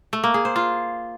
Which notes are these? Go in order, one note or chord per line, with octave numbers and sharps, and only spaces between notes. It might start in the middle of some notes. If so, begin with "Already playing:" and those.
A3
A#3
G#4
C5
F4